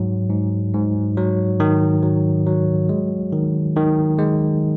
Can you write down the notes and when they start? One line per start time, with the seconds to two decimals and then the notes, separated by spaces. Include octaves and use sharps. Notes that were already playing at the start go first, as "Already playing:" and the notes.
Already playing: G#2 F#3
0.30 G#2
0.74 G#2
1.17 F#3
1.60 D#3
2.03 F#3
2.46 F#3
2.89 G#3
3.33 D#3
3.76 D#3
4.18 G#3